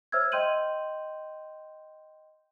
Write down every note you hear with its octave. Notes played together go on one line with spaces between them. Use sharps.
C5 C#5 E5 E6 F6 G#6
D#5 G5 C6 G6 D#7 F#7